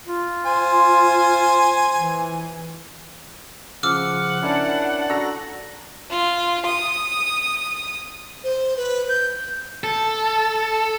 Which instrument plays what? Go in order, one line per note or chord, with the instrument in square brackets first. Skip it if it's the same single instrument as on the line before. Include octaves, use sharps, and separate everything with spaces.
[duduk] F4
[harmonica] C5 G#5
[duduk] E3
[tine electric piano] C#3 F3 [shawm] F#5 [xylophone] D6 E6 F6
[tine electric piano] C#4 E4 A#4 [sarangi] D4
[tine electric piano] D4 F#4 A4 [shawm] A#5 [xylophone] E6
[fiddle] F4
D#6
[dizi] C5
B4
G6
[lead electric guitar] A4